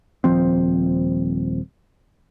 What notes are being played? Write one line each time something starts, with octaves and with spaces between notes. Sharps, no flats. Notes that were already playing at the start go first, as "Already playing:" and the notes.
D#1 E2 F3 C4